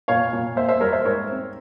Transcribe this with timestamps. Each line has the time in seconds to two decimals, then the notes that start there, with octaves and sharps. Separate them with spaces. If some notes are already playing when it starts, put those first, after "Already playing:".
0.08 A#2 C#5 F5
0.33 A#2
0.56 A#3 C5 E5
0.69 C5 E5
0.81 G3 A#4 C#5
0.93 C5 E5
1.04 G#2 A#4 C#5
1.29 C4